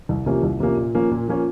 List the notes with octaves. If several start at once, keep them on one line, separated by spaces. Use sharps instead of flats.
C2
C3 F3 A#3 C#4
C2
C3 F3 A#3 C#4
A#2
F3 A#3 C#4
A#2
F3 A#3 C#4